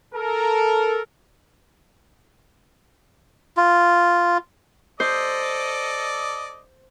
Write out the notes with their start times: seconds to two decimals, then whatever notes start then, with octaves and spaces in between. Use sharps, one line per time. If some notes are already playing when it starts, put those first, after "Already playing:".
0.15 A4 A#4
3.57 F4
5.00 A4 C5 D5 D#5